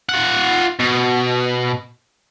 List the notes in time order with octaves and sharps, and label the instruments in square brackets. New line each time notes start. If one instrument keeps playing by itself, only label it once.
[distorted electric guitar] F4 F#5
B2